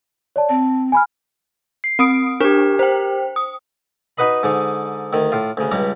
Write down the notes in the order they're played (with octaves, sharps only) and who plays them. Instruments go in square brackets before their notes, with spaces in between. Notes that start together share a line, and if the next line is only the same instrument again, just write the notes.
[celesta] C#5 D5 A5
[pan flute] C4 [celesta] A5
[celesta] G#5 B5 F6
[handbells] C7
[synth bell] C4 D#6 D7
[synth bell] D4 [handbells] G4 A#4
[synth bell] C5 G5
D#6
[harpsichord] D#4 F#4 B4 D#5 B5
G#2 D3 D#4
D2 D#3
A2 F4
D2 C#3
C#2 G2 G3 A#5